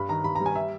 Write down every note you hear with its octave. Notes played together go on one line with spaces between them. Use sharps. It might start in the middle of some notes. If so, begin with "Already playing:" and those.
Already playing: G2 B5
D#3 A#5
G2 B5
A#5
G3
G#5
E5